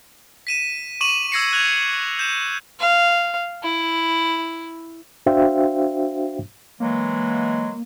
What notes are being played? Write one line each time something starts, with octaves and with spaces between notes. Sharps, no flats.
B6 D#7 E7
C#6 D6 D#7 E7 F#7
E6 G#6 A#6 C7 C#7
F#6 G#6 F7
G6 E7
F5
E4
D4 F#4 C5 E5 F5 G5
E3 F#3 G#3 A#3